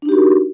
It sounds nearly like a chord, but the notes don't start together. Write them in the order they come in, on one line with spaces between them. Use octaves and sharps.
D4 D#4 G4 F#4 A#4